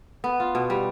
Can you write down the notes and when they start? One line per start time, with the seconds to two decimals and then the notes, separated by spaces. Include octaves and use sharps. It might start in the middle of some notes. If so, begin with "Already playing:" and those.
0.24 B3
0.40 F4
0.55 B2
0.70 G3